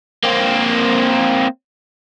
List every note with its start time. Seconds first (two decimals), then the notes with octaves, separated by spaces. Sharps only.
0.24 A#3 C4